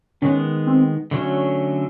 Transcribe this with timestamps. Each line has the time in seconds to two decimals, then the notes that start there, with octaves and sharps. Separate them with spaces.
0.22 D#3 G#3 B3 C#4
0.67 C4
1.11 D3 F#3 A3 C#4 F#4